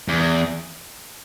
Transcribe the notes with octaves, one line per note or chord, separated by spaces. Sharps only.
E2